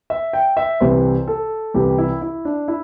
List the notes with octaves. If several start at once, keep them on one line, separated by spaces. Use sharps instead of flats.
E5
G5
E5
C2 C3 E3 C5
A4
C2 C3 E3 G4
E4
E4
D4
E4